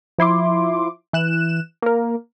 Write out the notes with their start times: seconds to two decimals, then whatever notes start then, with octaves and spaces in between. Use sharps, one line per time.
0.18 F3 E4 C6 D6
1.13 E3 F#6 E7
1.82 A#3 A#4